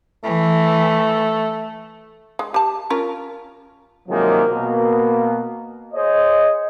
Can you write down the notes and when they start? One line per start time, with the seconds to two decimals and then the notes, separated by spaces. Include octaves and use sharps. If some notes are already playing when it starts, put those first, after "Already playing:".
0.24 E3 A3
2.39 G#3
2.54 G4 A5
2.90 C#4 F4 A#4
4.08 C3 D#3 F3 F#3 G#3 A#3
4.50 B2 A#3
5.94 G#4 C5 C#5 D#5